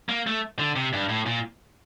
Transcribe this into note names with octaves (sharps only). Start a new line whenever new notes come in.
A#3
A3
D3
C3
G2
A2
A#2